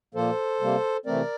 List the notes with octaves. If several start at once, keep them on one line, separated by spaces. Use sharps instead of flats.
A#2 F3 A#3 A4 C5
C3 G3 A#3
C3 E3 A3 C4 A#4 D5